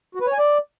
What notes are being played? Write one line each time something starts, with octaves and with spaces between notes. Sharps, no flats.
F#4
B4
C#5
G#5
D5